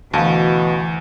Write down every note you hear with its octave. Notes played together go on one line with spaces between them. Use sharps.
D2 B2 E3 F5 A5 A#5